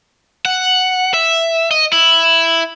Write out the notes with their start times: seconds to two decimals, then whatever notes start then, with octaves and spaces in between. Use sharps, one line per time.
0.46 F#5
1.14 E5
1.71 D#5
1.93 E4